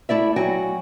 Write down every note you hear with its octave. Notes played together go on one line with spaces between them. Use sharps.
A3 E4 D5 E5
F#3 F#4 G5 G#5